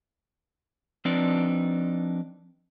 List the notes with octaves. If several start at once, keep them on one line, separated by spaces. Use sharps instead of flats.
F3 C4 D4 D#4 B4 D5